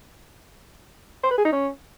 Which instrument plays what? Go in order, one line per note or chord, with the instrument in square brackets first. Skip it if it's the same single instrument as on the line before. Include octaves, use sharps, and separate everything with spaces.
[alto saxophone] C5
B4
G#4
D#4
C#4